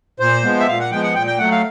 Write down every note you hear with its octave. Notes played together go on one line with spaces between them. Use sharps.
A#2 C5
F3 G#3 B3
E5
A#2 F5
F#5
F3 G#3 B3 G5
F#5
A#2 G5
G5
F#3 A3 F#5
F5